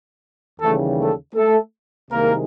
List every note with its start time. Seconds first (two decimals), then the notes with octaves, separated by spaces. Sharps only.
0.60 D#2 C#3 E3 G3 A3 A4
0.98 A3 A4
1.35 A3 A4
2.10 C2 C3 D#3 G#3 A#3 A#4